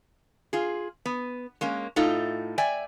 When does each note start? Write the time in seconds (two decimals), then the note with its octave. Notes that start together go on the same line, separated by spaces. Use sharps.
0.53 F4 G#4
1.06 B3
1.61 G#3 A#3 C#4
1.96 A2 D#4 F4 A4
2.58 D5 E5 G5 G#5